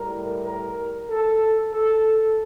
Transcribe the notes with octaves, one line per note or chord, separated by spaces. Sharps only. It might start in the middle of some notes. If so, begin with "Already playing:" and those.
Already playing: A2 G3 A#4
A#4
A4
A4